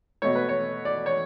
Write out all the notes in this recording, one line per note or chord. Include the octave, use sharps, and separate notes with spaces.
B2 A3 C#5
B4
C#5
D5
C#5